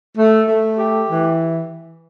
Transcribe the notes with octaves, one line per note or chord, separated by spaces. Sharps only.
A3
A3
G4
E3